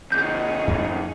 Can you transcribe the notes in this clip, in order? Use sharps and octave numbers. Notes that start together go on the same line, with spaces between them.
D#2 C3 C#4 D#4 G#4 G6
F2 A2 G#3